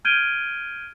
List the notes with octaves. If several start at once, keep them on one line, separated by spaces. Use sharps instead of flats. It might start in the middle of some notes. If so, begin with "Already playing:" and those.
F6 G6 G#6 D7 D#7 G7